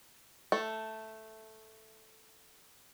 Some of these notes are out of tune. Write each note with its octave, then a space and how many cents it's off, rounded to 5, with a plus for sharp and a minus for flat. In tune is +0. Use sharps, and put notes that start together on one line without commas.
A3 +0 A4 +0